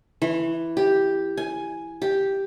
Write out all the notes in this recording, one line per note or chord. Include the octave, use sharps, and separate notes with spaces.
E3
G4
G#5
G4